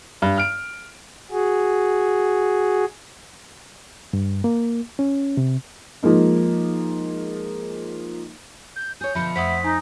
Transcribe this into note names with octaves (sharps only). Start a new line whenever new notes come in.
G2
F6 D7
F#4 G#4
G2
A#3
C#4
C3
F3 G#3 A#3 D#4
G6
G#4 C#5 G6
B2 D3 F3 E5 B5 C#7
F2 A3 C5 E5 F#5 C6 D#6 B6
D#4 G#5